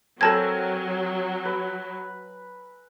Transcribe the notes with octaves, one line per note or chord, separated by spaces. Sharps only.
F#3 C4 A4 A#4 G#5 A5 G#6
B4